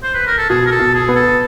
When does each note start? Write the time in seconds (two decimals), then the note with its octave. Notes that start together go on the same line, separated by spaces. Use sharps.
0.03 C5
0.14 B4
0.27 A#4
0.38 A4
0.50 B2 G#4
0.66 A#4
0.72 A4
0.79 B2
0.94 G#4
1.08 B3
1.16 A4